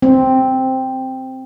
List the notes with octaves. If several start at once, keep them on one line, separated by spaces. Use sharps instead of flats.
C4